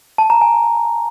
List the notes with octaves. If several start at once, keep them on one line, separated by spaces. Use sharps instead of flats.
A5
A#5
G#5